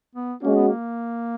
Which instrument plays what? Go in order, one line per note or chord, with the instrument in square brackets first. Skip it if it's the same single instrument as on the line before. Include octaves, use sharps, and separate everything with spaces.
[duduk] B3
[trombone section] G#3 C#4 F#4 [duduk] A#3
[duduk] B3
A#3